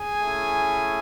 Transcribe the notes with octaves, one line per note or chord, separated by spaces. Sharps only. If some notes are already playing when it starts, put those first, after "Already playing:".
Already playing: G#4 G#5
A3 C#4 E4